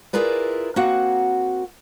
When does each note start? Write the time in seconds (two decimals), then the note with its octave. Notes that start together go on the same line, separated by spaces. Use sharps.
0.13 E4 F4 G#4 A#4 B4 D5
0.76 A#3 C4 F#4 F#5